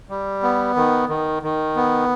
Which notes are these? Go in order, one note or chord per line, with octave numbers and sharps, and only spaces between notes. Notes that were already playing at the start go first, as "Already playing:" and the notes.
G3
B3
D#3
D#3
D#3
B3